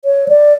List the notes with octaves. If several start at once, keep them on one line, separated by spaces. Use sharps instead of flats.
C#5
D5